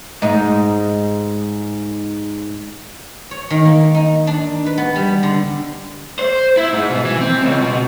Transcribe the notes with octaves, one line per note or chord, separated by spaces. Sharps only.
G#2 D#4
C#5
D#3
A#3
D#4
D4
B4
B3
G3
D3
C5
E4
G#2
B2
E3
C4
C#2
B2